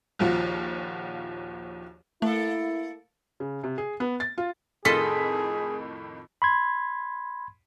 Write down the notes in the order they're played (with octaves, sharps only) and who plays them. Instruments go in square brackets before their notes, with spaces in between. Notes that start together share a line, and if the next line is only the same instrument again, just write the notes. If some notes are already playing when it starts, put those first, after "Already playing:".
[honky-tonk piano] A#1 D#2 F3 F4 F#4
[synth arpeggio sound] A3 [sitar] A#3 A4 [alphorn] E4
[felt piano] C#3
C3
G#4
B3
A6
F4
[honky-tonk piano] F2 A2 D#3 [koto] F4 A4 D#5 [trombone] G#4 [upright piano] B6
[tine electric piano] B5 C6 G#6